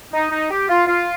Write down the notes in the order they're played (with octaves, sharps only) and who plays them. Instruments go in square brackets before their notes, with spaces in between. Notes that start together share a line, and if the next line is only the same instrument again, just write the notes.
[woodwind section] D#4
D#4
G4
F4
F4